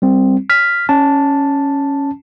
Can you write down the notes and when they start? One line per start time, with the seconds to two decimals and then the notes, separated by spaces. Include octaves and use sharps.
0.02 G3 C4
0.50 F6 B6
0.89 C#4 A5